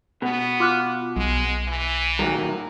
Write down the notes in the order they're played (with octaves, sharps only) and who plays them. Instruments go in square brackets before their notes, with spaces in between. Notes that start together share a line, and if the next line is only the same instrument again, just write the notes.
[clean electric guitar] B2 [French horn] B3
[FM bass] F4 [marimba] D6 F6 F#6
[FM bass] B1 [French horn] G#3
[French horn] E3
[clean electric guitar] A#2 D#3 F#3